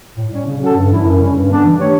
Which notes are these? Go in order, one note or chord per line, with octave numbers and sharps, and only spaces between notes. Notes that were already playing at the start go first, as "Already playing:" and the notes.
A2
G3 C#4
C#3
F#3 C#4 F#4 A4
G2
E3 G3 C#4 E4
F#2
C#3 G3 C#4
G2
D3 G3 B3 D4
E3
A3 D4 G4 C#5